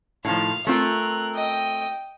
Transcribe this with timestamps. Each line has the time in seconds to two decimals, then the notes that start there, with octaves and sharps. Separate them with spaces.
0.25 A2 D#3 F3 F5
0.67 A3 C4 F4 A#4 F#6
1.35 D#5 G5